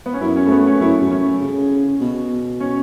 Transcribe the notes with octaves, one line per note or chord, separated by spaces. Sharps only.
B3
C#4
F#2 E4
C#4
A3
B3
C#4
F#2 E4
F#2
C#4
C#3
B2
C#4